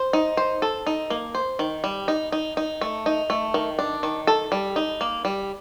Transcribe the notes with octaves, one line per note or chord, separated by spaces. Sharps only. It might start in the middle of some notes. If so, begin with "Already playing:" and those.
Already playing: C5
D#4
C5
A4
D#4
A#3
C5
D#3
G3
D#4
D#4
D#4
A3
D#4
A3
D#3
D4
D#3
A4
G3
D#4
A#3
G3